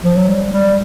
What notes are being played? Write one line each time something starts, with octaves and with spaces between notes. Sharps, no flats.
F3
F#3
G3
G3